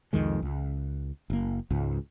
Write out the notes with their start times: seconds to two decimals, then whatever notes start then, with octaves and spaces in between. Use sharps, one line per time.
0.13 C2 F2 D#3 G#3
0.42 C#2
1.30 F#1 A#3
1.70 C#2 G#2